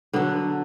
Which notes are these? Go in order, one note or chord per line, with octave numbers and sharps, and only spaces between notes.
D3 F#3 B3